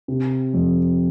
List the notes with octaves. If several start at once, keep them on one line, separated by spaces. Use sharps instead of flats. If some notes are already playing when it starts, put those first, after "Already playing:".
C3
F2